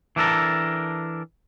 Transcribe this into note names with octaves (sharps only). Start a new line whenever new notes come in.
E3 D4 A4 A#4